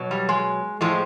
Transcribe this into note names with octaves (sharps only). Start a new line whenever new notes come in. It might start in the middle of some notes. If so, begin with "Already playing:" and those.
Already playing: B2 F#3
G3
G#3
A2 F3 G#3